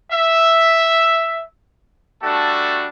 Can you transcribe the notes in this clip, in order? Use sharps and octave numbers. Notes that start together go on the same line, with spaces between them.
E5
G3 A3 D4 F#4 A4